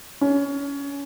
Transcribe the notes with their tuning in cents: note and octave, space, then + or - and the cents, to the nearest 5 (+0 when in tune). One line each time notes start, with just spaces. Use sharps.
C#4 +20